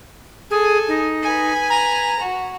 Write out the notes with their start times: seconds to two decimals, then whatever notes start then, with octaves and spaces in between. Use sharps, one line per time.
0.50 G#4 A4 G#5
0.88 D#4
1.23 B4 G#5
1.70 A#5
2.20 F#4